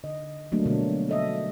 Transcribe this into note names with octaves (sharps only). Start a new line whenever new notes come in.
D3 D#5
F#3 G3 A3 A#3 D4
B2 D3 B3 D4
A4 D#5 E5